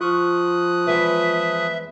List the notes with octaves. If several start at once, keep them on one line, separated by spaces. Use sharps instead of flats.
F3 F4 C#6 D#6 F6 F#6
E2 G#3 B4 E5